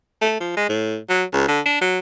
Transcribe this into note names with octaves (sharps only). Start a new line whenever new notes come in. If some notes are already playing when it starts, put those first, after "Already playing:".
A3
F3
G#3
A2
F#3
C#2
D3
D4
F#3